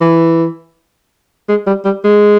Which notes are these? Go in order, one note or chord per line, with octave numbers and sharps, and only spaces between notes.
E3
G#3
G3
G3
G#3